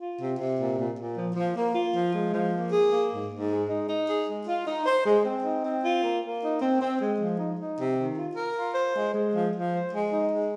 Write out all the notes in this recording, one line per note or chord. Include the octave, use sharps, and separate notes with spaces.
F4
C3
C3
A#2
A#2
A#2
F3
F3
A#3
F4
F3
G#3
F3
A#3
G#4
A#3
G#2
G#2
G#3
D#4
D#4
G#4
G#3
F4
D#4
C5
G#3
C4
D#4
C4
F4
A#3
A#3
D#4
C4
C4
G#3
F3
D#4
D#4
C3
D#3
F4
A#4
F4
C5
G#3
G#3
F3
F3
C5
G#3
D#4
G#3